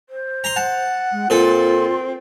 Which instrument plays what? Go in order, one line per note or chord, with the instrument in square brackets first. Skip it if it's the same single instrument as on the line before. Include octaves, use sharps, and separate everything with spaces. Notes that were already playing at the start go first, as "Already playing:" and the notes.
[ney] C5
[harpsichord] A#5 C6
[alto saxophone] F#5 [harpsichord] A5
[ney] G#3
[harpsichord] A#2 A4 [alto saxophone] C4 [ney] F4